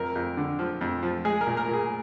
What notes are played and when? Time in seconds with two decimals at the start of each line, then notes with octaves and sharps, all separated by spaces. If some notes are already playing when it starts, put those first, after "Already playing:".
Already playing: F2 A#4
0.15 F2
0.37 D3
0.59 F3
0.81 F2
1.03 F3
1.25 G#3 G#4
1.41 A#4
1.47 A#2
1.57 A#4
1.68 A#2
1.74 G#4